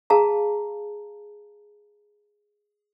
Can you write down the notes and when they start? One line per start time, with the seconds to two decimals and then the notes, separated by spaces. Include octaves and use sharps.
0.10 G#4 F5 A5 A#5